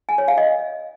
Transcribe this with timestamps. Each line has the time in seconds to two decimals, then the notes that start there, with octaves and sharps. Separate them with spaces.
0.09 G#5
0.18 C#5
0.28 F5
0.38 D#5